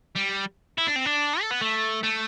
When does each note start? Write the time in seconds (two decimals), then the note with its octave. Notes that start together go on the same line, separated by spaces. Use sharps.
0.15 G3
0.78 E4
0.87 D4
0.96 C4
1.05 D4
1.41 A4
1.51 B3
1.62 A3
2.04 A3